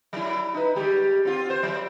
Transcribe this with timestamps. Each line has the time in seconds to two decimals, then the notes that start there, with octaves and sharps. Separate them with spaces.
0.13 F#3 E4
0.54 D#4 B4
0.75 G3 G#3 G4
1.25 C4 F4
1.50 C5
1.63 F#3